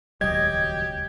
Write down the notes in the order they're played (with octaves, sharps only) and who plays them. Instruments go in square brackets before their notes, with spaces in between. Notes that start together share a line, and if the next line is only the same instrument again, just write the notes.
[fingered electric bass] D#1 C#2 [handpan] F#3 D#5 [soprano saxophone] G4 [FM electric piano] G#6